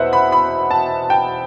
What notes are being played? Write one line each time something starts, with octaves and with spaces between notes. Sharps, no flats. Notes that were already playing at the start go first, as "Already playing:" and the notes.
Already playing: E2 B2 B4 C5 E5 F#5
B5
B5
A5
G5